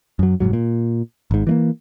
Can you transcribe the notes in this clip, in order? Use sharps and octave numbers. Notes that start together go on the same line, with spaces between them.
F#2 F#3
F1 C#2 G#2 F#3
A#2
G#1 G#2
E3 A3 A#3